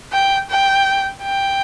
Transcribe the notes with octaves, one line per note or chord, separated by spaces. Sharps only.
G5
G5
G5